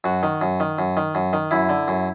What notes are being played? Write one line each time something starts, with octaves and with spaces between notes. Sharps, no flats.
F#2 F#4
D#3
F#2
D#3
F#2
D#3
F#2
D#3
F#2 E4
D3
F#2